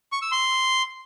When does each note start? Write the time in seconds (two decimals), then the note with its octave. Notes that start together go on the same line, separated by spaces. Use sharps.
0.12 C#6
0.22 E6
0.32 C6